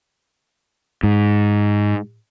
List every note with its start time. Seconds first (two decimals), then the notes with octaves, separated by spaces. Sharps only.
1.03 G#2